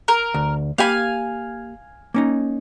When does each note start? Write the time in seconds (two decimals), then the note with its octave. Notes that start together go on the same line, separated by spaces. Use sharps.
0.08 A#4
0.34 D2
0.78 A#3 G4 F5 G#5 B5
2.14 A#3 C#4 D#4